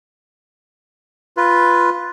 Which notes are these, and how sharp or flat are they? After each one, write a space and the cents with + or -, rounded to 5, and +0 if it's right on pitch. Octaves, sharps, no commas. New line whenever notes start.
F4 +0 B4 +0